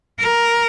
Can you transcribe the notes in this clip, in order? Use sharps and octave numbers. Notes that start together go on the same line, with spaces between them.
A#4